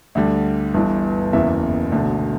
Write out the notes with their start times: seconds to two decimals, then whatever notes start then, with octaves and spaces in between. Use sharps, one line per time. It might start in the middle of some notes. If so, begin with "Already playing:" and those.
0.15 D2 D3 G3
0.74 G1 G2 E3
1.33 F#1 E2 C#3 E3 E5
1.92 E1 D2 D3